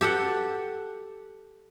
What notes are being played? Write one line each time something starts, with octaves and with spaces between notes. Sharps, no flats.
G4 A4 F#5 G5